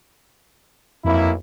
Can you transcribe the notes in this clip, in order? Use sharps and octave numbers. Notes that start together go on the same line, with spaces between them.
B1 F2 A#3 E4